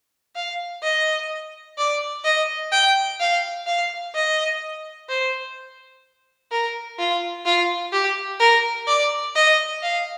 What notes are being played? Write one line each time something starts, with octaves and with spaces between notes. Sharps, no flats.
F5
D#5
D5
D#5
G5
F5
F5
D#5
C5
A#4
F4
F4
G4
A#4
D5
D#5
F5